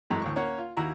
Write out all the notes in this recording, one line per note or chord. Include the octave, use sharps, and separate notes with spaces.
F#2 E3 G#3 A3
D2 A2 C#6
A#3 C#4 C#5 F#5
F4
D#2 E4 F#4 A#5